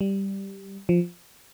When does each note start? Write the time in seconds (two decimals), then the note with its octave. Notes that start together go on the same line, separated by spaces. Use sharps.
0.01 G3
0.89 F3